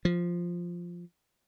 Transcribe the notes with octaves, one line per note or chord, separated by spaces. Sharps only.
F3